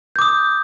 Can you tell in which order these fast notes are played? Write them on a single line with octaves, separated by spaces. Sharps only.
G6 D6 D#6